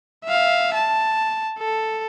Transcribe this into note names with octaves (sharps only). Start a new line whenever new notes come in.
E5 F5
A5
A4